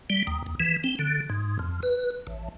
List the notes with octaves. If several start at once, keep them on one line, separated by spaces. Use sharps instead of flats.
G3
D#2
D#2
E3
C4
D3
G#2
F2
B4
A1